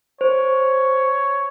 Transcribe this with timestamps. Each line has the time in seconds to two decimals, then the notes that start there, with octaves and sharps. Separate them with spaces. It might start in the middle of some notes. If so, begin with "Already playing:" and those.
0.21 C5 C#5